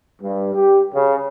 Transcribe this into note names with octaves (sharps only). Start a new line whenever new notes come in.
G2
G4
C#3